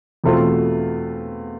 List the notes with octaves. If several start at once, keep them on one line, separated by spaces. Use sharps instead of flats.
E2 B2 A3 C4 F4